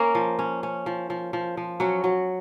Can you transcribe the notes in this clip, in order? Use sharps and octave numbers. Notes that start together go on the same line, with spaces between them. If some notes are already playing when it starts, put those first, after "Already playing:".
Already playing: A#3 C#4 A#4
F3
C#4
C#4
F3
F3
F3
F3
F#3 C#4 F#4
F#3